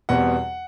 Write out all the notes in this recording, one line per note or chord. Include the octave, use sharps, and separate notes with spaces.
E2 B2 G3 C4 F#5